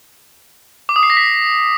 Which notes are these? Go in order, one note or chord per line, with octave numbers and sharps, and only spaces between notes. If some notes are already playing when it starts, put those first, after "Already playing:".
D6
D#6
C7
A#6
B6